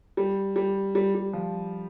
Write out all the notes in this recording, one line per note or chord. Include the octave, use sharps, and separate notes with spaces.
G3
G3
G3
G3
F3